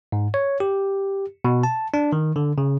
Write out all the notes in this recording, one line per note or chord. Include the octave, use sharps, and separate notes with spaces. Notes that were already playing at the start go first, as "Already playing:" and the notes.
G#2
C#5
G4
B2
A5
D4
D#3
D3
C#3